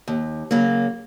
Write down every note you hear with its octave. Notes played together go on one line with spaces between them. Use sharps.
D#2
C#3 F#3 A#3